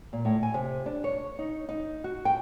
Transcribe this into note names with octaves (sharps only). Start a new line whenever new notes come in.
A#2
A2
G#5
C3
D4
C#5
D#4
D#4
F#4
G5